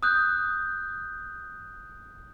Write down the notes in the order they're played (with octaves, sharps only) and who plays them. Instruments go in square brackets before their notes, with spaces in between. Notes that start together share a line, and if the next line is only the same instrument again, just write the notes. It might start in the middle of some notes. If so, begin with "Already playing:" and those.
[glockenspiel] D#6 F#6 G6